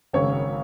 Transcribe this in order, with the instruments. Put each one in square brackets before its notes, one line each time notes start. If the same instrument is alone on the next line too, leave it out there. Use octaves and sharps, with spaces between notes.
[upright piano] G#1 F#2 C#3 G#3 C#5